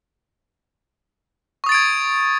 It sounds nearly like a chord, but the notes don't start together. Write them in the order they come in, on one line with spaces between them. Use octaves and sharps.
C#6 D#6 A6 D7 G#6